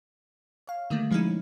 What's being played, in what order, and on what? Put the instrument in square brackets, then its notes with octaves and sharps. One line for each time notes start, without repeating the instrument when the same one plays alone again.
[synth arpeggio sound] C#5 F5
D3 D#3 G3 A3 A#3
B2 F3 G#3 C#4 D#4 E4